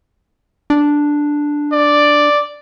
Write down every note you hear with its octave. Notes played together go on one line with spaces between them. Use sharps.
D4
D5